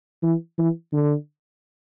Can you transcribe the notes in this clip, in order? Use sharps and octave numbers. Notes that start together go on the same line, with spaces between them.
E3
E3
D3